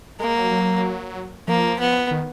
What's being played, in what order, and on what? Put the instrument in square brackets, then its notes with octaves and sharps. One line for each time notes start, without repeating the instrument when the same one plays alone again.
[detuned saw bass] G#3 [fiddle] A#3
[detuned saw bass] F#3
F#3
[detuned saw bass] F3 [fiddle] A#3
[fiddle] B3
[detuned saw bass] D#3